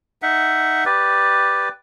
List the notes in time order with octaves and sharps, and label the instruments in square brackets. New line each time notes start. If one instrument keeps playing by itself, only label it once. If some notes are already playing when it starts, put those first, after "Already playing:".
[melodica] D#4 E5 F#5
G4 B4 D5